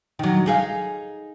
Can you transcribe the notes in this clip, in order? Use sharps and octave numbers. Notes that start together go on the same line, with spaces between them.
D#3 F#3
D#4 G#4 F5